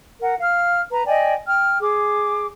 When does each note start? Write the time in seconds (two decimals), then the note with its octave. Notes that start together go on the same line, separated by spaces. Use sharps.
0.21 A#4 F#5
0.40 F5 F6
0.92 B4 A#5
1.06 D5 D#5 G5 G#5
1.47 G5 F6
1.81 G#4 D6